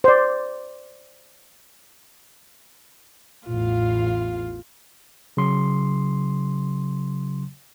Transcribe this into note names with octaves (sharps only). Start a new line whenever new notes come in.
C5 D5
A1 E2 F4 F5
C#3 F#3 C6